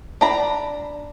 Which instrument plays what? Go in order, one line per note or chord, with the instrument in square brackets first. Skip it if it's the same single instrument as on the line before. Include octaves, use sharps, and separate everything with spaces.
[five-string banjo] D4 A#5 B5